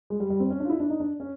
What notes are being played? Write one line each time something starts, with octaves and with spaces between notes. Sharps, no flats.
G#3
G3
G3
C4
C#4
D4
F4
E4
D4
D#4
D4
C#4